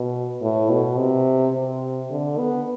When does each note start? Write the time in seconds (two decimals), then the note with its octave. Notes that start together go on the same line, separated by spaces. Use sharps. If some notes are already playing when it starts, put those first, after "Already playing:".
Already playing: B2
0.41 A2
0.69 B2
0.98 C3
1.54 C3
2.10 D3
2.38 B3